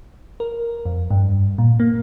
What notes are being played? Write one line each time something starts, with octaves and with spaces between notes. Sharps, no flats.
A#4
F2
G2
A#2
A#3